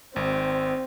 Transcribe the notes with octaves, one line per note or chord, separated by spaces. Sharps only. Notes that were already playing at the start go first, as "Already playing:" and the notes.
G#1 C4